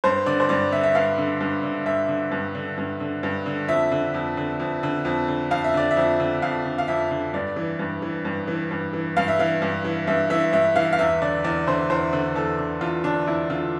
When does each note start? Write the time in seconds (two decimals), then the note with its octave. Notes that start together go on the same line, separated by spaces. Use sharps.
0.04 G2 C5
0.26 D3 D5
0.40 C5
0.49 G2 D5
0.72 D3 E5
0.84 E5
0.95 G2 F5
1.18 D3
1.40 G2
1.63 D3
1.86 G2 E5
2.08 D3
2.31 G2
2.55 D3
2.78 G2
3.00 D3
3.23 G2
3.46 D3
3.68 F2 E5
3.91 D3
4.14 F2
4.37 D3
4.60 F2
4.83 D3
5.05 F2
5.28 D3
5.51 F2 F5
5.64 E5
5.74 D3 D5
5.91 E5
5.97 F2
6.20 D3
6.42 F2 F5
6.66 D3
6.78 F5
6.88 F2 E5
7.11 D3
7.33 G2 D5
7.56 E3
7.79 G2
8.02 E3
8.25 G2
8.48 E3
8.71 G2
8.93 E3
9.17 G2 F5
9.28 E5
9.39 E3 F5
9.62 G2
9.84 E3
10.07 G2 E5
10.30 E3 E5
10.53 G2 E5
10.76 E3 F5
10.93 F5
10.99 E2 E5
11.22 D3 D5
11.44 E2 D5
11.67 D3 C5
11.90 E2 C5
12.13 D3
12.36 E2 A4
12.59 D3
12.81 E2 F4
13.04 D3 D4
13.27 E2 E4
13.50 D3 F4